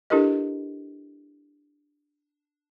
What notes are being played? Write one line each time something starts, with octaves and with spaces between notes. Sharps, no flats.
D4 E4 G4 A4 A#4 D#5